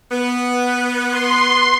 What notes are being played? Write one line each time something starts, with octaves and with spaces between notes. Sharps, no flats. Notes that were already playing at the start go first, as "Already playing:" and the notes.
B3
C6